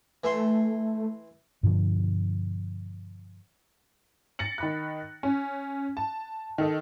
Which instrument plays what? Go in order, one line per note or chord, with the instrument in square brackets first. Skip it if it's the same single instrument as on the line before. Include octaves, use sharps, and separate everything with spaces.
[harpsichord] E3 E5 C6 [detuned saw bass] A3
[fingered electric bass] G2 B2 D3 F3
[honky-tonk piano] A6 A#6 C#7 F#7
D#3 B5 F#6
C#4
A5
D#3 A4 D#5